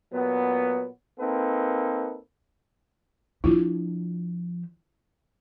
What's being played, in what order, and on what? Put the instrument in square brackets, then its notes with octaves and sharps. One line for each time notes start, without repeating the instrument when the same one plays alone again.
[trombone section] A#2 F#3 B3
A#3 C4 D#4 A4 B4
[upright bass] F3 D4 [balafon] E4 F4